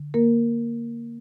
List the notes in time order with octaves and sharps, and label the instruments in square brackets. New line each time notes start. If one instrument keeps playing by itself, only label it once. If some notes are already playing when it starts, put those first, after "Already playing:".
Already playing: [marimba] D3
A#3 A#4